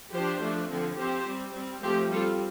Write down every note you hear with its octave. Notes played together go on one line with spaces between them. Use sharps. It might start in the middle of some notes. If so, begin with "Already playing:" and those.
F3 D4 G4 C5
F3 A3 D4
D3 F3 C4
F3 C4 G4 C5
G3 C4
G3 C4
F3 A3 C4 G4 C5
G3 C4 F4 A4